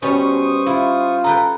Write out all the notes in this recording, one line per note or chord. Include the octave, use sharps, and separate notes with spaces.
B2 G3 C#4 C5 C#6 D#6
E4 F4
A4 B4 G5 A#5